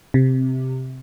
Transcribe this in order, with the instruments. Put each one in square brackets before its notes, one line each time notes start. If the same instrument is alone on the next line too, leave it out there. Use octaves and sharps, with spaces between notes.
[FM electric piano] C3